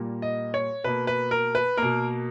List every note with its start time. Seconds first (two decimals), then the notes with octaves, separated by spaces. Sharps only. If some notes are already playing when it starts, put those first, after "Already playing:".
Already playing: A#2 G3 A#3
0.22 D#5
0.54 C#5
0.84 B2 A#3 B4
1.07 B4
1.31 A#4
1.55 B4
1.77 B2 A#3 A#4